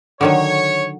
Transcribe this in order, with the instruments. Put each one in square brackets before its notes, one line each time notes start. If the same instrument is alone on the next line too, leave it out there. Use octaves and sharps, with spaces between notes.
[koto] D3 D#3 F#3 [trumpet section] C#5